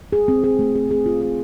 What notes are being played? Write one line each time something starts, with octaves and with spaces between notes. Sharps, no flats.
G#4
C4
G#4
A3
G#4
G#4
F4
G#4